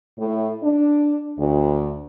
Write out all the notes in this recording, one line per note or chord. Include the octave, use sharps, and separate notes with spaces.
A2
D4
D2